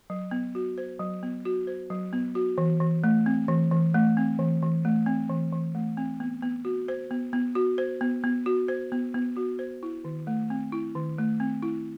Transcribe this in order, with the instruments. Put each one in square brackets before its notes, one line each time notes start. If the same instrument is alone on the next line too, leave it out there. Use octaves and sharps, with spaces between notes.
[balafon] F#3
B3
F#4
C5
F#3
B3
F#4
C5
F#3
B3
F#4
E3
E3
A3
C4
E3
E3
A3
C4
E3
E3
A3
C4
E3
E3
A3
C4
B3
B3
F#4
C5
B3
B3
F#4
C5
B3
B3
F#4
C5
B3
B3
F#4
C5
E4
D#3
A3
C4
E4
D#3
A3
C4
E4